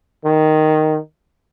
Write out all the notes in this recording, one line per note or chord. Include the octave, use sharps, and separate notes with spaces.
D#3